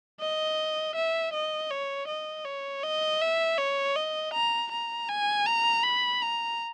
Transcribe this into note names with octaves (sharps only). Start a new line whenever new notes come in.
D#5
E5
D#5
C#5
D#5
C#5
D#5
E5
C#5
D#5
A#5
A#5
G#5
A#5
B5
A#5